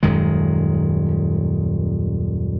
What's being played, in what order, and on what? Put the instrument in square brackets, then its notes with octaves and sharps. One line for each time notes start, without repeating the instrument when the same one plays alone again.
[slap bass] D#1 F#2 D#3 G#3